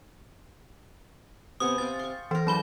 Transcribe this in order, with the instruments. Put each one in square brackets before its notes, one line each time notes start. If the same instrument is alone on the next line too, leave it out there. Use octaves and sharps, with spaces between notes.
[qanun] C3 B3 G#5 [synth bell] D#6
[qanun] C3 F5 G5 [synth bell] A6
[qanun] C6 C#6
[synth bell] E3 [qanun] A#4 C5
[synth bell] F#3 B5 G7 [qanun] D4 F4 G#4